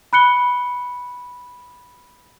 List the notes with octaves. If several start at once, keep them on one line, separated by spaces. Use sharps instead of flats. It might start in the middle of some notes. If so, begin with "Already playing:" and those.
B5 F#6 C#7 G7